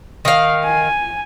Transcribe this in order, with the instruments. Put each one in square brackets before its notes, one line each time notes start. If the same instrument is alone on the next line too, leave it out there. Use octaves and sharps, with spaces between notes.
[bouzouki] D#3 F5
[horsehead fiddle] G#5